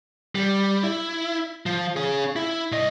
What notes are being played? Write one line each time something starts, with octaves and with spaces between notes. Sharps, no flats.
G3
E4
F3
C#4 G#4
E4
C2 D#5